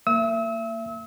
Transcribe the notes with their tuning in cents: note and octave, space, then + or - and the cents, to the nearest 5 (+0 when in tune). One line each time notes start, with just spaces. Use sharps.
A#3 -25 E5 +25 E6 -40